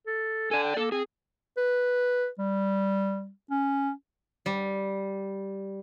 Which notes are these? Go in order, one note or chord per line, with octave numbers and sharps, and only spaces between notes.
A4
A4 D5 G#5
G5
A#3 A4
C4 G#4
B4
G3
C#4
G3